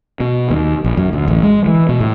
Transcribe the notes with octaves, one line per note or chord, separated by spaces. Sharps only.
B2
D#2
A#1
F#2
D2
A1
G#3
E3
B2
A2